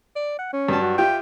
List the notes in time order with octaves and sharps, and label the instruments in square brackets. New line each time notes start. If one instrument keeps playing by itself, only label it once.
[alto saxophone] D5
F#5
C#4
[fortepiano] G2 F#3 A5
[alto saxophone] F#4
[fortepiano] F4 G4 E5 [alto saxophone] G5